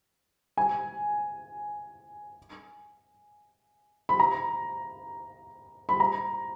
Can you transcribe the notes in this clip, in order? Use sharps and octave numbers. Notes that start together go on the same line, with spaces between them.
G#5
B5
A#5
B5
A#5